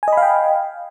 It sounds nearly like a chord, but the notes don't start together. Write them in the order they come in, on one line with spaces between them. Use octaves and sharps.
G#5 D#5 B5 F5 G5